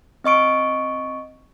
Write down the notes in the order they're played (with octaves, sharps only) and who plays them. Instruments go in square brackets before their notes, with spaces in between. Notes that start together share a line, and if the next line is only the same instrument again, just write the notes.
[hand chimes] C4 D#5 C#6 D7